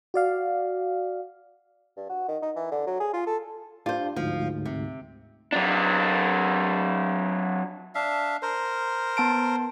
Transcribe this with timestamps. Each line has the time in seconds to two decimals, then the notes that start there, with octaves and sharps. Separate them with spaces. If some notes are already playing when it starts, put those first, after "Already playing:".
0.14 F#4 D5 F5
1.97 G2
2.09 F#4
2.28 D#3
2.42 D#4
2.56 E3
2.72 D3
2.87 F#3
3.00 G#4
3.13 F4
3.27 A4
3.86 D4 F4 G4 C5
4.16 D2 G#2 F3
4.65 C3
5.53 F#3 D4
7.95 D4 E5 F5
8.42 A#4 C5
9.17 B3 A5 D7